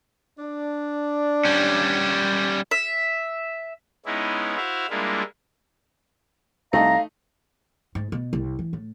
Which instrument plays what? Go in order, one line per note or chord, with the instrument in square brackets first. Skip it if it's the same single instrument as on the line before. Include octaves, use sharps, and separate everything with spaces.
[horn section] D4
[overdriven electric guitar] G3 C#4
[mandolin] E5
[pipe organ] G#3 B3 C#4 D#4 E4
E4 F#4 C5 E5 F5
G3 G#3 A#3 D4 E4 F4
[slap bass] C2 [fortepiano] A3 D#4 [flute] F5 [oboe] A#5
[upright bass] G#2
B2
C2
E3
A2